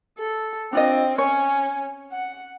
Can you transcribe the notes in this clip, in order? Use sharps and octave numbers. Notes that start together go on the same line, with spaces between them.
A4
C4 D4 F4 D#5
C#4 C#5
F#5